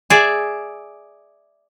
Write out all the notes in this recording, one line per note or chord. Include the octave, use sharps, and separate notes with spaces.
G#4 D5 E5